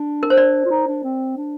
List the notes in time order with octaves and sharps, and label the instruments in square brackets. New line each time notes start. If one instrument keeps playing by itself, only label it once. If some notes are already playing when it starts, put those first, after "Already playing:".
Already playing: [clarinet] D4
[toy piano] A#4
C5
D5
[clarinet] F4
D#4
D4
C4
D4